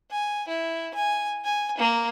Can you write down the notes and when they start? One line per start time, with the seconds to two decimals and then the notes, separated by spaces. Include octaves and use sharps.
0.12 G#5
0.48 E4
0.95 G#5
1.45 G#5
1.78 A#3